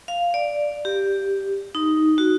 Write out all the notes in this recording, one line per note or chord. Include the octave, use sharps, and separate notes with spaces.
F5
D5
G4
D#4
F#4